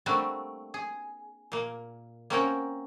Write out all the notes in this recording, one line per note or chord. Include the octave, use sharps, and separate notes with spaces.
G3 A3 A#3 C4 D4 F#4
G#4
A#2 A#3
A#3 C4 C#4 A#4 F#5 G5